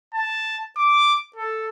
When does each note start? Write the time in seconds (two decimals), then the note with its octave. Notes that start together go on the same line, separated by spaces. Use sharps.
0.14 A5
0.77 D6
1.36 A4